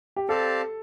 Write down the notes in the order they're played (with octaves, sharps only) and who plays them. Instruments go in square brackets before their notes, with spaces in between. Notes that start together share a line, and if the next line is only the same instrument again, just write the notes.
[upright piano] G4
[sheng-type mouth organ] C4 G4 D5 F5 A5 [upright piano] A4